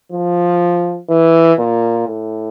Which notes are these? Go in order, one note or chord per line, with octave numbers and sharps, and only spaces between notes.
F3
E3
A#2
A2